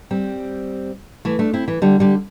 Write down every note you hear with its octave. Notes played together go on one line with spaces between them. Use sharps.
G3 C4
E3 A3
A3 D4
C4 E4
E3
D3 G3
D3 G3